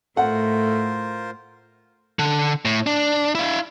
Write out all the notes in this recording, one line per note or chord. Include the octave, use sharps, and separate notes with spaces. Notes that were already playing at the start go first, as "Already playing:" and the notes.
A2 A3 F4 A#4 C5 F#5
D3
A2
D4
E4 F5